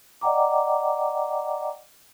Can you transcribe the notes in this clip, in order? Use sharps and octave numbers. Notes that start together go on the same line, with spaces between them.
D5 D#5 F#5 G5 A#5 D6